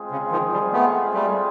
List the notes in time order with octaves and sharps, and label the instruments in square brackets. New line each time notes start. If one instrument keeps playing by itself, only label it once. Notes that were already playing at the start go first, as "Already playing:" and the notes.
Already playing: [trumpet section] G#3 C4 F4 G#4 C5
[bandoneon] C#3
D#3 F3
F3 G3
A3 B3
G3 A3